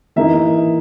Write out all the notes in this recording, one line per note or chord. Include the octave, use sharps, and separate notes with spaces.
E3 A#3 D#4 E5